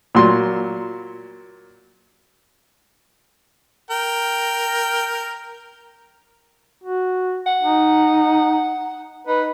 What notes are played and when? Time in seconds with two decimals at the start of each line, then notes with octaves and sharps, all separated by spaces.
0.15 A#2 F#3 C6
3.90 A#4 G5
6.84 F#4
7.46 F#5
7.63 D#4
9.27 D#4 B4